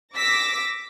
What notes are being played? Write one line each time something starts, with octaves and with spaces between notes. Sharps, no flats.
D6 E6 A#6 B6